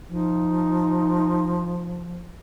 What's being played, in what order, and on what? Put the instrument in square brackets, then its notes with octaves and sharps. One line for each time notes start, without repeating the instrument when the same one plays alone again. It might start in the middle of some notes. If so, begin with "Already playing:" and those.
[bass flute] F3 [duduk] D#4